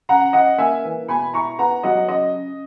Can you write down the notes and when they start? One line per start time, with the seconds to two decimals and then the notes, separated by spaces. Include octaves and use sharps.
0.09 C#3 F#5 A#5
0.33 C#3 D#5 F#5
0.58 A#3 E5 G#5
0.84 E3
1.08 B2 G#5 B5
1.34 E4 A#5 C#6
1.59 B3 F#5 A#5
1.83 F#3 D#5 F#5
2.08 C#3 D#5
2.34 C#3